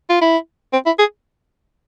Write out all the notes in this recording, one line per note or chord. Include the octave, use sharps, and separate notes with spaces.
F4
E4
C4
E4
G#4